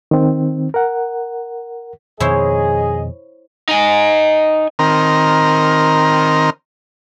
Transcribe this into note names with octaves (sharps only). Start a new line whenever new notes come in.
D#3 C4
A#4 F#5
F2 B2 D#3 E4 G#4 C5 C#5 D#5
D#4 G#5
D#3 C4 A#4